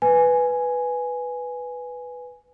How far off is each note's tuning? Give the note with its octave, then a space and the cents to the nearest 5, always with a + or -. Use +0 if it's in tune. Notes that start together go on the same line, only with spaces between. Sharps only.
B4 +0 G#5 +0